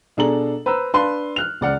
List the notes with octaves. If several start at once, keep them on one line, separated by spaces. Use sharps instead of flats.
B2 D4 G#4 A4 A#5 F#7
B4 C5 A#5 E6
D4 B4 F5 A5 C6
F6 F#6 F7
C#2 D5 F#5 F6